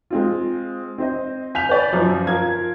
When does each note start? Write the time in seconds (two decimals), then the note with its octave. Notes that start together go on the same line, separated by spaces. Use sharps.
0.10 G#3 C4 F4
0.98 C4 C5 D#5
1.55 G#5 G6 B6 F7
1.69 B4 D5
1.93 F#2 F3
2.27 F4 A#4 F5 G#6